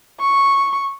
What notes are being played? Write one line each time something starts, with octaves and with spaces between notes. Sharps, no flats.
C#6